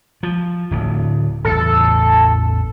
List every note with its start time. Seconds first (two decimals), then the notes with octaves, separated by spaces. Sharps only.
0.23 F3
0.71 D1 D2
1.45 A1 E2 A4